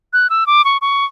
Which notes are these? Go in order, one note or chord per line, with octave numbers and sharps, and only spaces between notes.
F#6
E6
D6
C#6
C#6